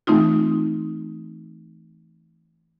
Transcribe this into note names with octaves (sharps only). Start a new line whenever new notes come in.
E3 A3 C4 D#4 F4